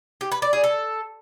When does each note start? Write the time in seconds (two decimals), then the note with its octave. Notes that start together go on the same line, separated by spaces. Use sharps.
0.21 G4
0.32 B4
0.42 D5
0.53 G#4
0.64 A4